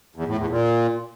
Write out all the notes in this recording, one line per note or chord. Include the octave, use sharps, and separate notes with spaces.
E2
A2
E2
A#2